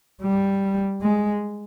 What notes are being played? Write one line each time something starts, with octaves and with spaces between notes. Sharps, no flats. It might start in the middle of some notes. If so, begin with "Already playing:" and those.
G3
G#3